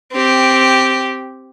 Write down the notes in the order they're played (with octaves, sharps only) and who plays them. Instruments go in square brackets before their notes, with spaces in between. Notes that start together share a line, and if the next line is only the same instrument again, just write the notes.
[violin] C4 G4